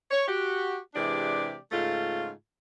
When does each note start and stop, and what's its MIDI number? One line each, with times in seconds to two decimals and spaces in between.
0.11 0.28 73
0.28 0.77 66
0.28 0.77 67
0.95 1.57 48
0.95 1.57 52
0.95 1.57 56
0.95 1.57 62
0.95 1.57 67
0.95 1.57 74
1.72 2.30 44
1.72 2.30 49
1.72 2.30 57
1.72 2.30 65